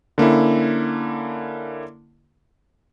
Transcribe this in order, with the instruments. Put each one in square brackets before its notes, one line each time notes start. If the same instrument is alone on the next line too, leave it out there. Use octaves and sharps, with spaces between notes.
[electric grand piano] D3 A#3 C#4 E4